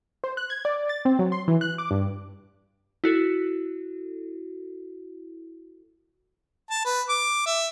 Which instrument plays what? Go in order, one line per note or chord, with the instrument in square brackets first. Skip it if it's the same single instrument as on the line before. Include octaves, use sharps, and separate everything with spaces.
[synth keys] C5
F#6
G#6
D5
A6
C4
F#3
C6
E3
F#6
D6
G2
[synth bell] E4 F#4 A4
[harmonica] A5
B4
D6
E5